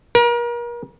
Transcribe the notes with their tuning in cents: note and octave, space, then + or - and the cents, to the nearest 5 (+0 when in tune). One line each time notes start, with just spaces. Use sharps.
A#4 +35